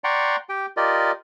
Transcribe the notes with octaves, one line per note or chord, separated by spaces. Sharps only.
D5 F#5 G5 A#5 C6 C#6
G4 G5
F4 G4 A#4 D5 D#5